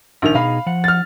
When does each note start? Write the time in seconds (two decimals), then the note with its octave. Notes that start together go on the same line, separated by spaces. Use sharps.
0.22 A#1 D#3 F7
0.35 B2 D#4 G#4 F5 B5
0.66 F3 F#5
0.84 F6 A6